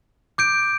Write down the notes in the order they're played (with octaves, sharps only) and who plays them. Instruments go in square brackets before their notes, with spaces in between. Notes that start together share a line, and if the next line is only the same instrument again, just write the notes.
[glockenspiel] D6 G6 D7